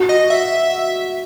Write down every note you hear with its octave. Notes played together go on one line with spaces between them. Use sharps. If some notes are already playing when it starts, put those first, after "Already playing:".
Already playing: F#4
D#5
E5